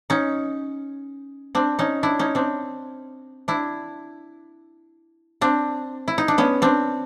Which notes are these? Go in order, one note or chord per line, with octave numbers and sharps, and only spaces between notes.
C#4 D#4
C4 D4
C#4 D#4
D4 E4
C#4 D#4
C4 D4
D4 E4
C4 D4
E4
D#4
D4
B3 C#4
C4 D4